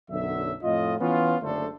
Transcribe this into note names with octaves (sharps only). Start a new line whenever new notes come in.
B1 F#2 D3 F#3 E5
F2 A2 F4 D#5
E3 B3 C#4 F4
F#1 D3 A3 D4 A4 C5